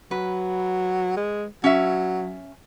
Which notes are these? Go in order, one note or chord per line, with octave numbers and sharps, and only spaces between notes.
F#3 B4
G#3
F#3 C#4 E5